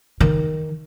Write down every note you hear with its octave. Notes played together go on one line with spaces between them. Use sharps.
D#3